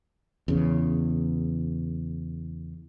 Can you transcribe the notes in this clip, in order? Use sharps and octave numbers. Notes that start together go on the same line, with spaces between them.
E2 C#3